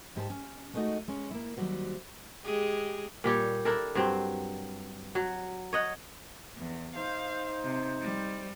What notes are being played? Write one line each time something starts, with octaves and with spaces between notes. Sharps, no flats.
G#2 G4 B4 A5
C#4
G#3 A3 B3 D4 D#4 F#4
G#3 C#4
A#3 E4
D#2 F#3 G3 F#4 C5
G#3 G4 G#4
A#2 G3 G4 C#5
D4 E4 A4 A#4
G2 F#3 C4
F#3
C#5 D#5 F#5
E2
D#4 C5 F5
C3
G3